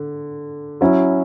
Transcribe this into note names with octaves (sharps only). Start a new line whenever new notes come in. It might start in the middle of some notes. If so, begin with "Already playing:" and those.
Already playing: D3
F#3 C#4 E4